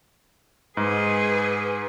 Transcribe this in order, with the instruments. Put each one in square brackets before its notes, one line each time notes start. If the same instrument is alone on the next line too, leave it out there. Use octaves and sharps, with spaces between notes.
[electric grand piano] G#2 [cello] G#4 B4